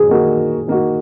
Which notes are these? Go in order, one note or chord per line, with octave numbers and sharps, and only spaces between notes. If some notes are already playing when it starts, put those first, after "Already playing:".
Already playing: G#4
D#3 A#3 F#4
D#3 A#3 F#4